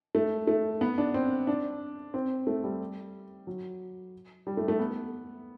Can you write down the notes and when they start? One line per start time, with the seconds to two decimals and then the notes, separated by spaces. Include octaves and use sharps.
0.15 A3
0.47 A3
0.81 B3
0.98 D4
1.14 C4
1.47 D4
2.14 C4
2.47 A3
2.64 G3
3.47 F#3
4.47 G3
4.57 A3
4.68 A3
4.79 B3